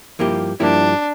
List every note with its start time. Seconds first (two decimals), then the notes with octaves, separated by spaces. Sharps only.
0.19 G2 F3 A#3 E4 G4
0.60 G2 F3 A#3 D4 E4 G4